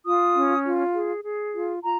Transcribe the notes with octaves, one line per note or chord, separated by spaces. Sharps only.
F4 D#6
C#4
F4
G#4
G#4
F4
F4 A#5